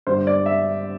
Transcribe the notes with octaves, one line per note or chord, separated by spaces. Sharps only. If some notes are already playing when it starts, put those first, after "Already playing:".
G1 G2 D3 C5
D5
E5